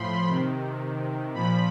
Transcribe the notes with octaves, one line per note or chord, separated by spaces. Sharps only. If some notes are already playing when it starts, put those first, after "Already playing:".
Already playing: A2 F3 B5 C6
C3 D#3
A#2 F3 B5